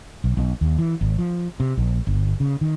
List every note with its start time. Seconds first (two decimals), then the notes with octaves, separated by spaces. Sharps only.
0.24 B1
0.37 B1
0.61 D#2
0.78 E3
1.01 G#1
1.19 F3
1.60 C3
1.77 A#1
2.07 G1
2.40 C#3
2.61 D#3